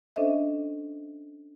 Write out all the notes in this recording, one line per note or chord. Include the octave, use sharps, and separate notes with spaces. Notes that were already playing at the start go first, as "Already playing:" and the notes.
C#4 D4 A4 C5 D#5 E5